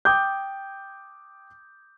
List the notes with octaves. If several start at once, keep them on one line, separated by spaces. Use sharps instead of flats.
G5 D6 D#6 G6